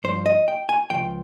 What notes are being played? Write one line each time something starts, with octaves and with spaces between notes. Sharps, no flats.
G2 F3 C5
D#5
G5
G#5
C#2 C#3 F3 G5